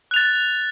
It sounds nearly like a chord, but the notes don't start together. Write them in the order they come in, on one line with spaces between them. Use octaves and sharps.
F#6 F7 A6